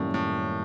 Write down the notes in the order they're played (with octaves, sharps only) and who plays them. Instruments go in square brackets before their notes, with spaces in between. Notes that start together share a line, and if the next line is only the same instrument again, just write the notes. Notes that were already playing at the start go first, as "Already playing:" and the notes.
Already playing: [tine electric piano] F#2 D#3 G3 A#3 C#4 [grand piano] A2
[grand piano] A2